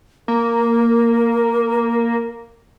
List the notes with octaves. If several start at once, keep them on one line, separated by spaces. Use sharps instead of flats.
A#3 A#4